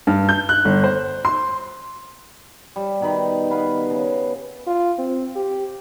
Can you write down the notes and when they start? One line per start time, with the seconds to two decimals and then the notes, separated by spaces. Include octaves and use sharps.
0.07 G2
0.29 G6
0.49 F#6
0.65 G1
0.84 C5
1.25 C6
2.76 G3
3.00 B2 D#3 B5
3.50 B3 B4 F5 B5
3.90 C#3
4.67 F4
4.99 C4
5.36 G4